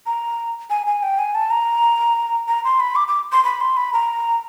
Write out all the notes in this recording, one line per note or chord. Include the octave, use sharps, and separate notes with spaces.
A#5
G#5
G#5
G5
G#5
A5
A#5
A#5
C6
B5
D6
D6
C6
B5
C6
B5
A#5